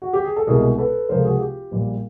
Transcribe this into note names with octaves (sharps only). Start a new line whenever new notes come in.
F#4
G4
G#4
A4
C2 B2 G#3 G#4 A#4
A4 B4
C#2 C3 F3 G#3 A#4 C5
A4
F#4 G#4
F4 G4
A#1 A#2 G3